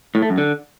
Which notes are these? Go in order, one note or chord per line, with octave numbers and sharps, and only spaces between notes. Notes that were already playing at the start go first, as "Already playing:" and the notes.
A2
A3
F#2
D3